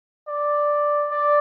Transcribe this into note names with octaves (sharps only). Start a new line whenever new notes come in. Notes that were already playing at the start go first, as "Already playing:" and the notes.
D5
D5